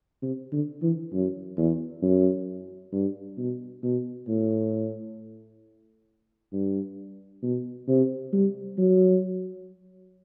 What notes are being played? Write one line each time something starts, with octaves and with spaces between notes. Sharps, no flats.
C3
D3
E3
F#2
E2
F#2
G2
B2
B2
A2
G2
B2
C3
G3
F#3